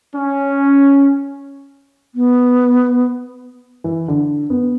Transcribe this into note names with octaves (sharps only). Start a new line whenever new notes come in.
C#4
B3
E3
D3
B3